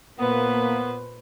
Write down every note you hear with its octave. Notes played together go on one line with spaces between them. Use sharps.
A#2 A#3 B3 B4 C5